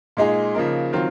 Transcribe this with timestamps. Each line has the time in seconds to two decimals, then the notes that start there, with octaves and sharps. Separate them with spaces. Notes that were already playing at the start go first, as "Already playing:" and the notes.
0.17 A#2 G#3 D#4 G#4
0.54 C#3 F3 A#3 D#4 A#4
0.93 D#3 F#3 C4 F4